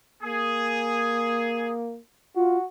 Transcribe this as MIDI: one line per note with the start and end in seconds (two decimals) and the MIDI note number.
0.23 1.98 58
0.23 1.72 68
2.36 2.57 65
2.36 2.64 66